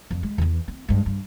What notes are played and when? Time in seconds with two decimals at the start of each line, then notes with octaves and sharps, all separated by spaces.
0.11 F2
0.23 G#3
0.38 E2 E3
0.68 C4
0.88 G2 G#3
1.06 G2